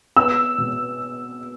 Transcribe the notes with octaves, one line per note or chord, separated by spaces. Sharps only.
B3 E6
B2